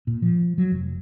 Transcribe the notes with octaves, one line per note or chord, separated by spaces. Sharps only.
A#2
F3
F#3
F1